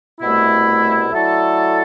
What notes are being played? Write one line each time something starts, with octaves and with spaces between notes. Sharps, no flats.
C2 B2 A3 E4
F#3 A3 E4 A4 D5